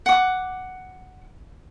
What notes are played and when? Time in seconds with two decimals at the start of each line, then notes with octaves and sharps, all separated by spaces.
0.06 F#5 D6